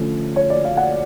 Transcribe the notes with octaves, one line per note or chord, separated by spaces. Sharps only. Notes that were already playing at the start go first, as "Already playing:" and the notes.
Already playing: D3 F3 A3 C#4
C#5
D5
F5
F#5